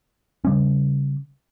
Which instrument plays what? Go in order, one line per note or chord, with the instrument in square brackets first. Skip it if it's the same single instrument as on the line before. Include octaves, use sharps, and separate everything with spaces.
[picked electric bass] C#3 G3 C#4